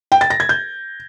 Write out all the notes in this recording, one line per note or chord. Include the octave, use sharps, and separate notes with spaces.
G5
A6
A#6
G#6
G6